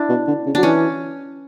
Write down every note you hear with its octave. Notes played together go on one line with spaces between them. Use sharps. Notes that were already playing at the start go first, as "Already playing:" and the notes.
Already playing: D4 E4
B2
D3
C#3
F#3 D4
E3 C#4